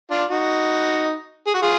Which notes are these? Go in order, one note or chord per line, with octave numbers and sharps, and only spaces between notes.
D4 F4
D#4 F#4
G#4
F#4
F4 G#4